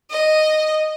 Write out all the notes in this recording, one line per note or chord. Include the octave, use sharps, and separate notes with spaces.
D#5